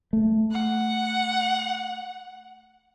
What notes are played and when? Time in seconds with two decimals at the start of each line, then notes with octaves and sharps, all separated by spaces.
0.13 A3
0.51 F#5